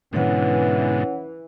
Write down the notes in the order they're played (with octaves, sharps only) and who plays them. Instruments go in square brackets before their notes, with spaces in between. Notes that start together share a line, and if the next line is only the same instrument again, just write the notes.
[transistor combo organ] G#2 B2 D3 [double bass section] E3 [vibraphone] C#4 C#5 F#5